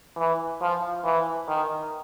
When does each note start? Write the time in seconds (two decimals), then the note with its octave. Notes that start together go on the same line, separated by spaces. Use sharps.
0.17 E3
0.61 F3
1.04 E3
1.48 D#3